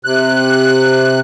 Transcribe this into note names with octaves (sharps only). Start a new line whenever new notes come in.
C3 F#6